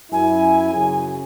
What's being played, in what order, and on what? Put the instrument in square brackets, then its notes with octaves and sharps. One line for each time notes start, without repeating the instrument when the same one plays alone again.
[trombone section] F#2 E4 [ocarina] G#5
[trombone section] F#2 C#3 G#4